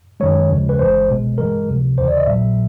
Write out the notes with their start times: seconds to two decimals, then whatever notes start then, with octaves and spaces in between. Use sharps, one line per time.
0.20 F#2 D#3 G#3 C#5
0.50 D#2 C#3 F3 G#3
0.69 B4
0.79 G1 G2 E3 G#3 C5
1.09 C2 B2 G#3
1.38 G2 E3 G#3 A#4
1.68 C#2 C3 F3
1.98 D#2 C#3 E3 C5
2.08 D5
2.17 D#5
2.26 A#1 A#2 F#3 E5